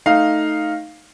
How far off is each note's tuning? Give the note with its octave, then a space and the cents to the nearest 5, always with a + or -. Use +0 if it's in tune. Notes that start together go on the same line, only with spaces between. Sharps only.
A3 +0 D#4 +0 F5 +0